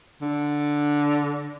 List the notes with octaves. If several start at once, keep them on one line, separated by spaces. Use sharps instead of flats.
D3